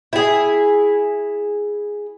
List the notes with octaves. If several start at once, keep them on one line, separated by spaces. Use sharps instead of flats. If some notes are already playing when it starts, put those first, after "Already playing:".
E4 G#4